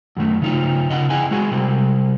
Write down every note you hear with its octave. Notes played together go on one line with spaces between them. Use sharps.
F#2 D#3 A3
C#3 D#4 F4
C#3 D#5 F#5
C4 E4 G#4 F#5 G#5
G#3 F#4 G#4
C3 G3